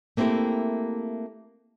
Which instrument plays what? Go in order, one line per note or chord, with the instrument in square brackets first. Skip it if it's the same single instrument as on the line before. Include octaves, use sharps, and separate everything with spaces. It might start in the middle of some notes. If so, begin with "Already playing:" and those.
[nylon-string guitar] A3 A#3 C4 E4 G4 A#4